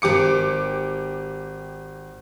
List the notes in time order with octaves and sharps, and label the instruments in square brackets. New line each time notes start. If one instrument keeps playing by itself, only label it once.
[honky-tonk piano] G#1 G4 D6 C#7